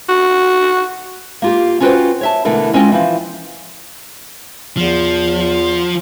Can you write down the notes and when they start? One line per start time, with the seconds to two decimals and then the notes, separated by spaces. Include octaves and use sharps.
0.09 F#4
1.42 A#3 F4 G4
1.80 C#4 F4 F#4 B4 C5 G5
2.21 C#5 E5 A5
2.45 B2 D3 E3 A3 A#4
2.73 G#3 C#4 F4 D#5 G5
2.92 E3 F3
4.77 E2 F3